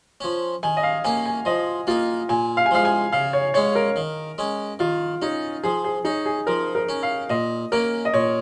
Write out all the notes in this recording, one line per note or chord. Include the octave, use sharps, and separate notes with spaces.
F3 C#4
D#3 G#5
D#5
F5
A#3 C#4 G#5
G#5
F3 D#5
A#3 D#4 F4
A#2 G#5
F5
G#5
F3 G#3 F5
G#5
C#3 F5
C#5
G#3 C#4 C#5
A#4
D#3
G#3 C#4
D#3 F4
C#4 D#4
F3 G#4
G#4
C#4 D#4
G#4
F3 A#4
A#4
C#4
F5
A#2 D#5
A#3 C#4 A#4
D#5
A#2 C#5